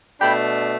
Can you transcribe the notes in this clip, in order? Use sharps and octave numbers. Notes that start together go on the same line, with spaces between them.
B2 A3 D4 G5 B5